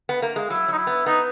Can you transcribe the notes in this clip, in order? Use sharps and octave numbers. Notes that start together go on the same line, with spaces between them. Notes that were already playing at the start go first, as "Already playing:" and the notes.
B3
A#3
G#3
F#3 E4
F#3 D#4
E4
B3
B3 D#4